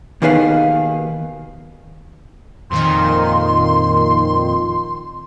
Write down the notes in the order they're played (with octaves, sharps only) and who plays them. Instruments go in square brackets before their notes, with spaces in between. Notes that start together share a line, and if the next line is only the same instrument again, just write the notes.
[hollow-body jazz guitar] D#2 B2 D#3 G#4 B4 F5
[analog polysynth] F2 A#2 D#3 [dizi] C6